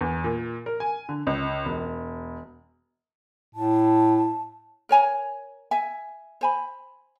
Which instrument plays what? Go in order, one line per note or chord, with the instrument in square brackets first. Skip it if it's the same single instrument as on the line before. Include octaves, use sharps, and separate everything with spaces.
[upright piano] E2
A#2
A#4
G#5
D3
C#2
E1
[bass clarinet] A2 [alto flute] A5
[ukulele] A#4 C#5 G#5 A#5
E5 G#5
C5 G#5 B5